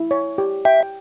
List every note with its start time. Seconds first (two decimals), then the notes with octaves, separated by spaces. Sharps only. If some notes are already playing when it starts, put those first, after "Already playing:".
Already playing: E4
0.11 C#5
0.38 G4
0.65 E5 G5